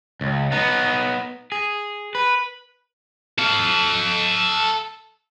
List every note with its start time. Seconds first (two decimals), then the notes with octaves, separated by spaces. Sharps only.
0.21 C#2
0.52 B3 D#4
1.52 G#4
2.15 B4
3.39 A4 F5